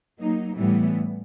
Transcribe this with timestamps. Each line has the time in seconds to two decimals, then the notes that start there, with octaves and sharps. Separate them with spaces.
0.20 F#3 A#3 D#4
0.57 A2 E3 G3 B3